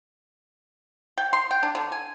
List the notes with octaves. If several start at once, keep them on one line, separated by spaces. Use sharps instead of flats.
G5
C6
G5
D4
D3
G#5